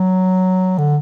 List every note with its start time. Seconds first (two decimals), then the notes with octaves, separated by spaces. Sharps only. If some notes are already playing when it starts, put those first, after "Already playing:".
Already playing: F#3
0.78 D3